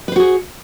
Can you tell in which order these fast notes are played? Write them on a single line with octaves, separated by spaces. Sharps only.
B4 C5 F#4 G#4